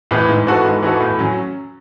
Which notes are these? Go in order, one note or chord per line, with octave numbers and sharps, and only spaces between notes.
A2 E3 B3
G#2
E3 B3 F#4 A4
G#2
E3 B3 F#4 A4
A2
F#3 C#4